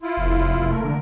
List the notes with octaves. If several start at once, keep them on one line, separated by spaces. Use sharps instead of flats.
E4 F4
F1
F1
A3 A#4
D3